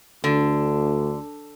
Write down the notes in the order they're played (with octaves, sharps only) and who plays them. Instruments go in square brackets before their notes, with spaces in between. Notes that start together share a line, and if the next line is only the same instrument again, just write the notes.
[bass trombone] D2 [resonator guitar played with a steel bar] D3